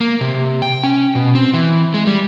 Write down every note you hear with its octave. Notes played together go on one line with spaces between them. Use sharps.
A#3
C3
G5
C#4
B2
C4
E3
G#3
G3